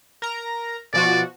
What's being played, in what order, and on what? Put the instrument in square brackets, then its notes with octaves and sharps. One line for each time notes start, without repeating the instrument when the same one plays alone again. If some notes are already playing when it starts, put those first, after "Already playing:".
[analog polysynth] A#4 A#5
[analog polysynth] B2 F3 F#4 [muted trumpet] D5